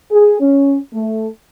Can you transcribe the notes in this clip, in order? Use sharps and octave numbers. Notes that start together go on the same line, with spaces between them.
G#4
C#4
A3